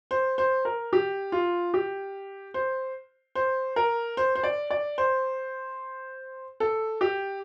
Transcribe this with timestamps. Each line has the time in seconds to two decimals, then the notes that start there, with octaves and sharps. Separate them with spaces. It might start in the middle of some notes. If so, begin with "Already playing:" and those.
0.11 C5
0.38 C5
0.65 A#4
0.93 G4
1.32 F4
1.74 G4
2.54 C5
3.35 C5
3.76 A#4
4.17 C5
4.35 C5
4.43 D5
4.71 D5
4.98 C5
6.60 A4
7.01 G4